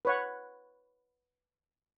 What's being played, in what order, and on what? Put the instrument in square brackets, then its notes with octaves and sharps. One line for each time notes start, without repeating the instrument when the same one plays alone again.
[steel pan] B4 C#5 F#5